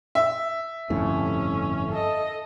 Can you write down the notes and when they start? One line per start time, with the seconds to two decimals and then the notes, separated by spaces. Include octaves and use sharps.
0.15 E5
0.90 G1 F2 A2 C#4
1.92 A4 D#5